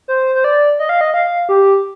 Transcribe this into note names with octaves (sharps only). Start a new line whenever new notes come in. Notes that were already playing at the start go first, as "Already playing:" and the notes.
C5
C5
D5
D#5
F5
D#5
F5
G4